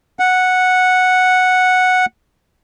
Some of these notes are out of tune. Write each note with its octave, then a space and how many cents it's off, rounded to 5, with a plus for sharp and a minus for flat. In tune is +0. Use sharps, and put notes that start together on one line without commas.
F#5 -5